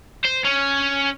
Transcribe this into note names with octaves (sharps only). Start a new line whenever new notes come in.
C5
C#4